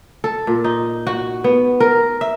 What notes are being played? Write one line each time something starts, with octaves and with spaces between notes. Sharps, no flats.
A4
A#2
D#4
F#4
B3
A#4
E5